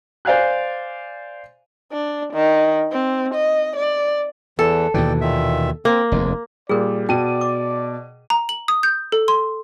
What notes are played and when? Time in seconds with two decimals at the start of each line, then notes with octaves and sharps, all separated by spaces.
0.25 C5 D5 F5 G#5 F#6
1.92 D4
2.33 D#3
2.91 C4
3.34 D#5
3.76 D5
4.59 E2 E3 A4
4.94 D#2 B2 E3 D5 G5
5.21 A#2 D#3 E5
5.85 A#3 C4
6.12 F1 D#2 G#3
6.69 A#2 G3 G#4 A#4 D5
7.09 B2 D5 G5 A5 D#7
7.41 D6
8.30 A#5
8.49 F#7
8.68 D#6
8.83 G6
9.12 A4
9.28 C6